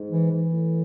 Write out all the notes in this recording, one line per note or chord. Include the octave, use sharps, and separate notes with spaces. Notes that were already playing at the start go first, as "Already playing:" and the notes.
Already playing: G#2
E3
E3
A2